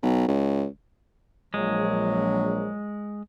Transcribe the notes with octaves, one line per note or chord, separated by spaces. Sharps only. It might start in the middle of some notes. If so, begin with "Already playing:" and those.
B1
C#2
A#1 F#3 G#3